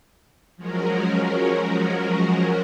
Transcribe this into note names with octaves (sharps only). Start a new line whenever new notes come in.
F3 F#3 G#3 C#4 F#4 A#4